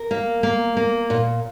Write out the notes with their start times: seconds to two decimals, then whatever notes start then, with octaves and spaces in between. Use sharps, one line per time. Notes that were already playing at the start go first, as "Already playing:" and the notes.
Already playing: A#4
0.11 A#3
0.43 A#3
0.77 A#3
1.10 A#2